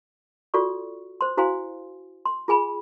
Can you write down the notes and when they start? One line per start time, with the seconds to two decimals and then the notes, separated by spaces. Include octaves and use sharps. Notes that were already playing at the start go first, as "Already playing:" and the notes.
0.54 F4 F#4 A4 D5 C#6
1.21 C5 C6
1.37 E4 F#4 C5 F5 G#5 C6
2.25 C6
2.48 F4 G#4 G#5 B5